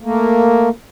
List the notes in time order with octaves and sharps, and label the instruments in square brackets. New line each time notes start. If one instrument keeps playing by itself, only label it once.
[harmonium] A3 A#3